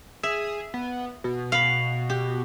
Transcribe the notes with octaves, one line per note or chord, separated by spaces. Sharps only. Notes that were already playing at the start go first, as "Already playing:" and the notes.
G#4 E5
B3
B2
F5 B5
G4